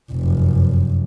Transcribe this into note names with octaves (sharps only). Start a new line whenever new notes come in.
F1 F#2